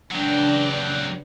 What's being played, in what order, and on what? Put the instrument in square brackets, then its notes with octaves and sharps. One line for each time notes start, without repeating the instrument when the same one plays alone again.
[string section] C#3 D4 B4 [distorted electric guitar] F#3 G4